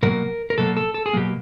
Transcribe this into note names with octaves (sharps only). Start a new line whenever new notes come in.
B2 F#3 A#3 A#4
A#4
B2 F#3 A#3 A4
A4
A4
G#4
B2 F#3 A#3 G4